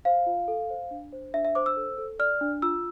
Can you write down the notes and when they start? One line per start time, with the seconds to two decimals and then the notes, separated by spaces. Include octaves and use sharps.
0.05 C5 F5
0.26 F4
0.48 A4
0.70 C5
0.91 D4
1.13 C5
1.34 D4 E5
1.45 E5
1.55 C5 D6
1.66 E6
1.77 A4
1.98 A4
2.19 D5 F6
2.41 D4
2.62 F4 E6